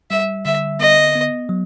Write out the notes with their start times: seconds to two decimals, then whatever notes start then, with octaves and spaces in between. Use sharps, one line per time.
0.11 G3 E5
0.45 D3 E5
0.79 B3 D#5
1.15 B3
1.49 F#3